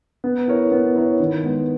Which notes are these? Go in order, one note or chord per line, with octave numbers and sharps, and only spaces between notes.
B3
E4 A#4 C#5
B3
E4 A#4 C#5
D#3
G#3 B3